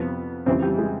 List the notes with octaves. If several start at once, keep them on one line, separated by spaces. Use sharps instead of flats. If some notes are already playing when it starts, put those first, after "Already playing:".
Already playing: F2 C3 F3 B3
F2 C#3 E3 G3 C4
G3
G#3